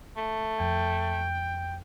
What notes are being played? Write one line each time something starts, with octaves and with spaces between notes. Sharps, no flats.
A3
F2 G5